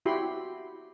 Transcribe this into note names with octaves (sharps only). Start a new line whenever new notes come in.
E4 F#4 G4 B5 C6